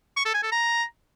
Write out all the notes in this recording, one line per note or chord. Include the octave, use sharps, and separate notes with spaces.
C#6
A4
G#5
A4
A#5